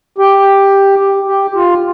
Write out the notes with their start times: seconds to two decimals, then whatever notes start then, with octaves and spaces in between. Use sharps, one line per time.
0.18 G4
1.27 G4
1.55 F4